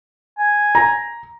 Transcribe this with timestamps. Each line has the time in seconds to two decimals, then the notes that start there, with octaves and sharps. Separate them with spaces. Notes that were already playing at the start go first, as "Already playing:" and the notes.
0.38 G#5
0.75 A#5